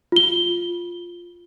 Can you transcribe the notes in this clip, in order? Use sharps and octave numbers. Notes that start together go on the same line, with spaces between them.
F4 G7